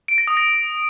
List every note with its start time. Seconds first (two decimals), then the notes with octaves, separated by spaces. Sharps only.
0.08 D7
0.18 A#6
0.27 D#6
0.37 A#6